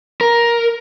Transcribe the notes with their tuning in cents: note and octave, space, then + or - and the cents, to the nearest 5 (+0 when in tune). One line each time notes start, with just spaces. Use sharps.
A#4 +10